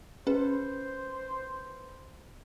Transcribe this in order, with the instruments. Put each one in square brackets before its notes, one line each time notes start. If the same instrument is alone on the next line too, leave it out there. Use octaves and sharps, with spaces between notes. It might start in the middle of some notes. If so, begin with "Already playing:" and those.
[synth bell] C#4 G#4 [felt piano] B4 [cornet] C5